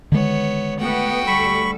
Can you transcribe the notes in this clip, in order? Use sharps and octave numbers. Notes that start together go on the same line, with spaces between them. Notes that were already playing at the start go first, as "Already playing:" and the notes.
D3 D#3 G#3 B3 C#5
A3 B3 F#4 G5
D2 G3 A4 B5 C#6